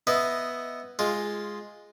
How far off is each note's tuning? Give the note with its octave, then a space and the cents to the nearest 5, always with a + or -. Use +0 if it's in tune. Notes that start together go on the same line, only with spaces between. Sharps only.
B3 +0 E4 +0 D#5 +0
G#3 +0 F4 +0